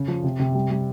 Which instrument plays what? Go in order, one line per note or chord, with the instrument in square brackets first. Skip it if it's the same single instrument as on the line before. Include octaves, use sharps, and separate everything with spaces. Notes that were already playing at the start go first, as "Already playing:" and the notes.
Already playing: [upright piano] C#3
F3
C3
C3
G3
G3